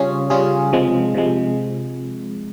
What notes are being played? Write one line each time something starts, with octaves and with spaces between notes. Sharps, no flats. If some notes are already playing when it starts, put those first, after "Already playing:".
Already playing: C#3 G3 C#4 F4 G#4
C#3 G3 C#4 F4 G#4
C3 F3 G#3
C3 F3 G#3